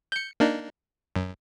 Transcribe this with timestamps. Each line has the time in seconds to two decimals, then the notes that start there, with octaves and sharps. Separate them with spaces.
0.12 G6 C#7
0.40 A#3 D4 D#4
1.16 F#2